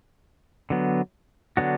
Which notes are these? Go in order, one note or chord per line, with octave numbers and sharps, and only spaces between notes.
D3 F#3 B3
D3 F#3 B3 D4 F#4